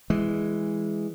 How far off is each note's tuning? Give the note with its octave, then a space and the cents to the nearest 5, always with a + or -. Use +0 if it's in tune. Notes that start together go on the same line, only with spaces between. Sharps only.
E3 +0 G#3 -10